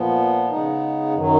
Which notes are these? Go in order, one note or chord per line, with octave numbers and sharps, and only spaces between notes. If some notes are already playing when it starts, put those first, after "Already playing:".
Already playing: A#2 F3 B3
C#3 G#3 B3 D#4
F#2 D#3 F#3